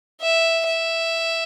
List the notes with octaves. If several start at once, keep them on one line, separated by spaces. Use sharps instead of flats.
E5
E5